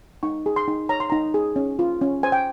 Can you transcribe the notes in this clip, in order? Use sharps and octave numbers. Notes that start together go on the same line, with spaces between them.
D#4 C#6
G#4
C6
D#4
C#5 A#5
C6
D#4 A#5
G#4
C#4
F4
C#4
C5 G#5
G5